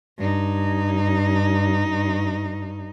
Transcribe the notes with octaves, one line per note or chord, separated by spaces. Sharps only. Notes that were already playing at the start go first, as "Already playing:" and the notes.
G2 D#4